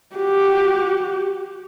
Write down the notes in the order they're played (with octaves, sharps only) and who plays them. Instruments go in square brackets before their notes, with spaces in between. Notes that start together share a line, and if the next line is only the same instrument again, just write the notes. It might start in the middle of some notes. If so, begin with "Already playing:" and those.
[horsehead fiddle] F#4 G4